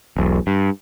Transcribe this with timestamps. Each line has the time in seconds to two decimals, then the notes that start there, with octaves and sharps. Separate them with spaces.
0.17 E1 B1
0.47 G2